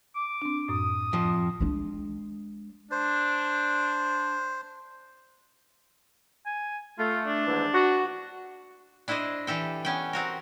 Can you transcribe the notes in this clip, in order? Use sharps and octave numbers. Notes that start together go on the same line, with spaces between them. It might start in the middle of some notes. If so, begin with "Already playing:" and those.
D6
C4 D4
F#2 A2 D#6
F2 F3
G#3 D4
D4 C5
G#5
A3 F4
D4
D#2 G#2 E3
F#4
D4 E4 C5 D5 D#5
E3 G4 A4 G5
B3 C#4 G5
C4 F#4 A#4